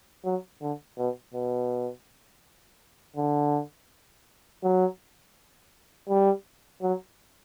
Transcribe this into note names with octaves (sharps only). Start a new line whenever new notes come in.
F#3
D3
B2
B2
D3
F#3
G3
F#3